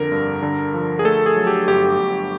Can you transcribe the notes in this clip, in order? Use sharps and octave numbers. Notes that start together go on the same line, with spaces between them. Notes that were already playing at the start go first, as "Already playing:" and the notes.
Already playing: F2 D3 A#4
G2
D3
F3
G#4
A3 A4
G#4
F#3
G4
G1 G4
G1